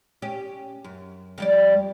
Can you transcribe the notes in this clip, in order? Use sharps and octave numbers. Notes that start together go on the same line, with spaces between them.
C#4 G4
F#2
F2 G3 D5